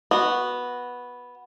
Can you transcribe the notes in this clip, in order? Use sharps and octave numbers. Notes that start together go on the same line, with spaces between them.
B3 F#4